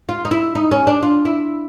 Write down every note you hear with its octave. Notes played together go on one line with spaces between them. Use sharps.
F4
D#4
E4
D#4
C#4
D4
F4
E4